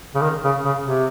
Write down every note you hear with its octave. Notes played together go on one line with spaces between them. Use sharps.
C#3
D#3
C#3
C#3
C3